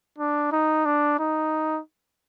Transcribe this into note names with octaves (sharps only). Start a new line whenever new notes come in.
D4
D#4
D4
D#4